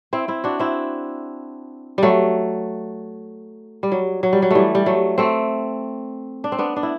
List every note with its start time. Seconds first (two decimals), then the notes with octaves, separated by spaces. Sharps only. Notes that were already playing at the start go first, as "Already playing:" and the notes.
0.13 C4 E4
0.28 C4 E4
0.44 D4 F#4
0.59 C4 E4
1.98 F#3 G3 A3
3.83 G3
3.92 F#3
4.23 F#3
4.33 G3
4.42 F#3
4.51 E3 G3 A3
4.75 G3
4.86 F#3 A3
5.18 A3 C4
6.44 D4
6.52 C4
6.59 B3 D4
6.76 D4
6.83 E4